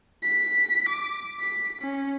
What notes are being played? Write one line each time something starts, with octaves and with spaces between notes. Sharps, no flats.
B6
D6
B6
C#4